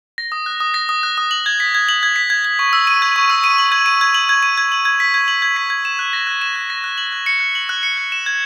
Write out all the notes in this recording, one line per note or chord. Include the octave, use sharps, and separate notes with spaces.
A#6
D#6
F#6
D#6
A#6
D#6
F#6
D#6
F#7
G#6
B6
G#6
F#7
G#6
B6
G#6
G#6
C#6
E6
D#7
G#6
C#6
E6
D#7
F#7
G#6
D#7
G#6
F#7
G#6
D#7
G#6
F#7
G#6
B6
G#6
F#7
G#6
B6
G#6
E7
F#6
A#6
F#6
E7
F#6
A#6
F#6
F#7
F#6
C#7
F#6
F#7
F#6
C#7
F#6
E7
G#6